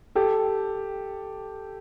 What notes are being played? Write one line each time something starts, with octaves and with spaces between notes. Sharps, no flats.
G4 A4